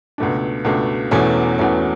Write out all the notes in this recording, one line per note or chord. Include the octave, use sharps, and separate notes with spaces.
C#2 B2 A3 D4
C#2 B2 A3 D4
E1 E2 B2 A3 C#4
E1 E2 B2 A3 C#4